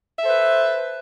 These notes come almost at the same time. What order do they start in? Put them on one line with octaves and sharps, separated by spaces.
E5 A4 C5 B4